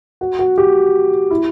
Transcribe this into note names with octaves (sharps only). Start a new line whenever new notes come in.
F#4
F#4
G4
E4